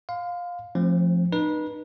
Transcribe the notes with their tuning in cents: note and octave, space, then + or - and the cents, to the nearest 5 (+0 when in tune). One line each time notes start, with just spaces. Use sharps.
F5 +15 C6 -35
F3 +0 A3 +0 C4 +40
D#4 -30 B4 -30